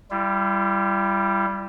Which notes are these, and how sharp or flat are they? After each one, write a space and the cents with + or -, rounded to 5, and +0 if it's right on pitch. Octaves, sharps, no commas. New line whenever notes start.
G3 +0 E4 +45